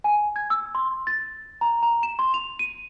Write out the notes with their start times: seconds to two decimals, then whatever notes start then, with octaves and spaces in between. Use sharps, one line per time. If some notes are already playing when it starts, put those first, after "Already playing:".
0.04 G#5
0.36 G#6
0.50 E6
0.75 C6
1.07 A6
1.61 A#5
1.83 A#5
2.03 E7
2.19 C6
2.34 F7
2.59 D#7